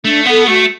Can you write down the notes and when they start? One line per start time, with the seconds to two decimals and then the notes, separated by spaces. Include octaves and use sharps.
0.05 A3 D4
0.26 B3 A4 F#5
0.48 A3 F#4